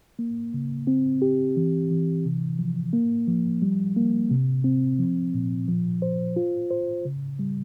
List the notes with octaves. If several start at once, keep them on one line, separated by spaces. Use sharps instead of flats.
A#3
C#3
C4
G4
E3
E3
C3
F3
A#3
F3
G3
A#3
C3
C4
F3
A#2
F3
C5
F4
C5
C#3
G3